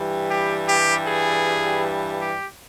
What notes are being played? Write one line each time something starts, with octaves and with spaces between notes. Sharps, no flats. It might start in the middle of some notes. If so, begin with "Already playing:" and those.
Already playing: G2 E3 G3
G4
G4
G#4
G4